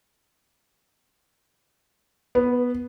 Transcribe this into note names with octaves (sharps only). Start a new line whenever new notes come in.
B3